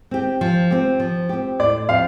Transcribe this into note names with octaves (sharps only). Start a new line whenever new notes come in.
C4 G4
F3
C4 G4
F3
C4 G4
A2 D5
F3 C4 G4 F5